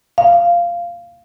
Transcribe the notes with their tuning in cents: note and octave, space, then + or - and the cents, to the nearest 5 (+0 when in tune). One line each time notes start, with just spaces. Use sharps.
F5 -10